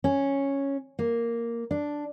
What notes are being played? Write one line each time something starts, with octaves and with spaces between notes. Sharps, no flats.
C#4
A#3
D4